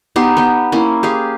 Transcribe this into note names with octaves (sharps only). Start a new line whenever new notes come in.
B3 D#4 G4 C6
B3 G5
A#3 C#4 E4
G4 G#4 F5